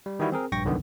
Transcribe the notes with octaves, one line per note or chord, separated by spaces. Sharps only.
G3
D#3 E3 G3 E4 F#4
C4 G#4 A#4
A#1 G2 G5 C#6 A#6
C2 F#2 D3 D#3 B3